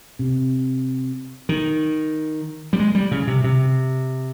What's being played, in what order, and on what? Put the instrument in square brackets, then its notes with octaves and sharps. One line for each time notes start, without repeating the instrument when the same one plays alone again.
[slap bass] C3
D#3
G3
G#3
G3
C#3
C3
C3